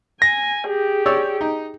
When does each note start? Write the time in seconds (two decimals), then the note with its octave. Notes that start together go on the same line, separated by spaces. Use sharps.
0.22 G#5 A#6
0.67 G4 G#4
1.06 C#5 D5 E6
1.41 D#4